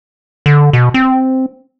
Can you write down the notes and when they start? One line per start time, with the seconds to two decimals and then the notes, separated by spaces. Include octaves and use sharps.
0.46 D3
0.73 B2
0.94 C4